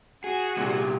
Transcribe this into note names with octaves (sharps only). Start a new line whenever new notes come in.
F#4 G#4
C2 A#2 G4